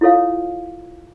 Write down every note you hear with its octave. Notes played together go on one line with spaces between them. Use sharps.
E4 F4 A4 C#5 F5